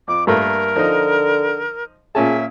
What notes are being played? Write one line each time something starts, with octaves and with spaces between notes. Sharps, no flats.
F2 D6
G2 A3 A#3 A#4
D3 F3 D#4
A#2 C#4 G#4 E5 A5